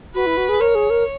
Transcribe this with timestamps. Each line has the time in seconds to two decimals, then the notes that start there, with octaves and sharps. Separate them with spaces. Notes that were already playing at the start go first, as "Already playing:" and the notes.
0.15 F#4 B4
0.26 E4
0.37 F#4
0.49 G#4
0.60 A#4 C#5
0.75 G#4
0.90 A#4